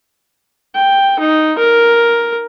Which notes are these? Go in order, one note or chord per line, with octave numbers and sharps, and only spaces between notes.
G5
D#4
A#4